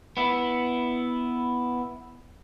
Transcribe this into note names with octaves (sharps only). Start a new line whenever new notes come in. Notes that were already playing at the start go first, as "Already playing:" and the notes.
B3 E4